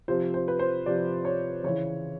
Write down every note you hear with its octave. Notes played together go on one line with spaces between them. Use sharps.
C3 F3 C5
C5
B4
C5
C3 F3 D5
C#5
C#3 E3 C#5